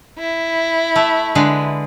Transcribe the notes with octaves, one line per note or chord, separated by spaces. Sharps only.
E4
A3
D3 G#3 B4